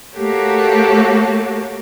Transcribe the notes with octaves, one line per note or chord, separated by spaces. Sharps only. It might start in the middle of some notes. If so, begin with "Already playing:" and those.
A3 A#3 F#4 G4 A4 C#5